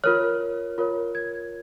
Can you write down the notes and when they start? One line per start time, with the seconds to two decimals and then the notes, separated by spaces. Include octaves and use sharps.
0.04 F4 A#4 C#5 F6
0.78 F4 A#4 C#5
1.15 G#6